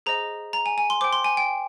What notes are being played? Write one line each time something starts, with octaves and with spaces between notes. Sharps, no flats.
G#4 C5 D#5 A#5
A#5
G#5
G#5
C6
C5 G5 D6
C6
G#5
G5